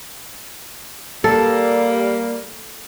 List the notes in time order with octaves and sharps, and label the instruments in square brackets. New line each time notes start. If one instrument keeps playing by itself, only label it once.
[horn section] G3 A#3 [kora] A4